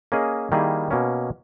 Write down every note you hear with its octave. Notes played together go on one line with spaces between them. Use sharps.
A#3 C#4 G#4 D#5
D#3 G3 A#3 E4 G#4
B2 A#3 C#4